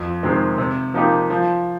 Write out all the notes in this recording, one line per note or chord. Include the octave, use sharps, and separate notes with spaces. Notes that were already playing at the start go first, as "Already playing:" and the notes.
Already playing: F2
C3 D#3 G#3 C4
C3
F3 A#3 D#4 G4
F3